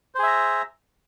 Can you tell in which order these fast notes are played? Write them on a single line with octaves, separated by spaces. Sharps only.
C5 G#4 E5 A#5